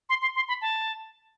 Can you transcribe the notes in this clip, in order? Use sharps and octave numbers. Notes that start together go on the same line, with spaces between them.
C6
C6
C6
B5
A5